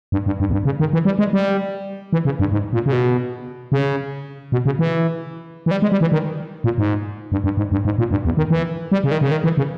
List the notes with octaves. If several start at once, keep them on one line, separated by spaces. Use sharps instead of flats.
G2
G2
G2
E2
G2
C#3
D#3
E3
G3
G#3
G3
E3
C#3
G2
G#2
A#2
C#3
B2
C#3
B2
C#3
E3
E3
G3
G#3
G3
E3
D#3
A#2
G#2
G2
G2
G#2
G2
G#2
A#2
G2
E2
D#3
E3
G3
C#3
D#3
C#3
D#3
E3
C#3